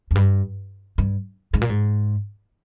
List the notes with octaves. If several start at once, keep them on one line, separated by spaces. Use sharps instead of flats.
F2
G2
G2
G#2
A#2
G#2